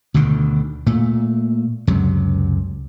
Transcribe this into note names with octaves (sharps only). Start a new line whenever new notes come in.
D2 B2 D3 D#3
A#2 A3
C#2 F#2 C3 F#3